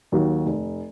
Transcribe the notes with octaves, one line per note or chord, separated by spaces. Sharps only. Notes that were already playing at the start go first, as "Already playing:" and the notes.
D#2 D#3 F#3
F1